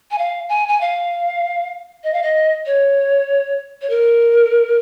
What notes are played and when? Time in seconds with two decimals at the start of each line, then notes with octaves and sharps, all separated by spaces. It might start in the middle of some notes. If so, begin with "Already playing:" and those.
0.10 G#5
0.18 F5
0.48 G#5
0.68 G#5
0.80 F5
2.03 D#5
2.13 F5
2.22 D#5
2.65 C#5
3.81 C#5
3.89 A#4